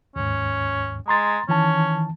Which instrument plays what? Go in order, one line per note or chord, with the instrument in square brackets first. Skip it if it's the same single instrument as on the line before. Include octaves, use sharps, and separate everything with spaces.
[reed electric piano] D#2 G#2 [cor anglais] C#4
[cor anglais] G#3 [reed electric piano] A#5 C6 A6
[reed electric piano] D#3 E3 A5 [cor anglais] C#4